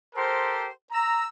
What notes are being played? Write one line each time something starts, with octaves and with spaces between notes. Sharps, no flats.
G4 A4 A#4 C5
A#5 E6